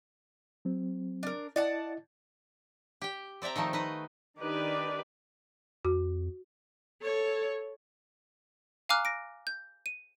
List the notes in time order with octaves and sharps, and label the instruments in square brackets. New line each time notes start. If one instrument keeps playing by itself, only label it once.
[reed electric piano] F#3 C4
[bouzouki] D4 A#4
[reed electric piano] E4 D#5 [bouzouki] D5 F#5 A5
[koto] G4 G5
C4 D5 E5 G5 A#5
D#3 F3 A3 D#4
D#4 B4 D#5
[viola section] D#3 D4 D#4 G4 B4 D5
[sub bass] F2 [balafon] F#4
[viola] A4 C#5
[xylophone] F5 G#5 A#5 D6 F6 F#6
A#6 D7
G6
D#7